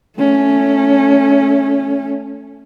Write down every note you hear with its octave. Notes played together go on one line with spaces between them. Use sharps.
A3 C#4